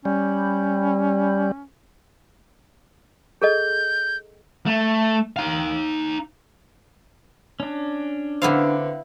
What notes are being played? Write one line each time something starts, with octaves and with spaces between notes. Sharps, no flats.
G3 C#4
G#4 A4 D#5 G6
A3
D#4 F5
C#4 D4
D3 B3 C4 E4 F5